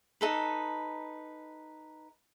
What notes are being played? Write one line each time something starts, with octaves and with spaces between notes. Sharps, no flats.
D#4 A4 B4